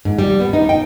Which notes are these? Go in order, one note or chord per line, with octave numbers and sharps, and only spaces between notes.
G#2
G3
B3
D#4
G5